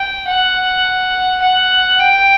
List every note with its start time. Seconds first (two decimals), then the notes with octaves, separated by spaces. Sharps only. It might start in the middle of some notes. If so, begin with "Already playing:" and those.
Already playing: G5
0.27 F#5
1.42 F#5
1.99 G5